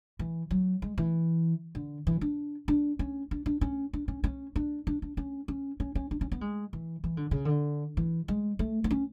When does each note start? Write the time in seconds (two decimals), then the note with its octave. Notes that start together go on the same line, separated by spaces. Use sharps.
0.19 E3
0.51 F#3
0.82 G#3
0.98 E3
1.75 D3
2.07 E3
2.21 D4
2.68 D4
2.99 C#4
3.31 D4
3.46 D4
3.61 C#4
3.93 D4
4.08 C#4
4.24 C#4
4.56 D4
4.87 D4
5.02 D4
5.17 C#4
5.48 C#4
5.80 C#4
5.95 C#4
6.11 D4
6.21 C#4
6.32 B3
6.41 G#3
6.73 E3
7.04 E3
7.17 D3
7.31 C#3
7.45 D3
7.97 E3
8.28 G#3
8.59 A3
8.84 B3
8.91 C#4